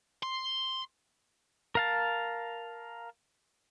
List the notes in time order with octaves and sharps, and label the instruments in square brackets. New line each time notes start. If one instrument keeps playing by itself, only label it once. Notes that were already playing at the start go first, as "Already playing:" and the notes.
[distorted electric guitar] C6
[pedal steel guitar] A#4 F5 A5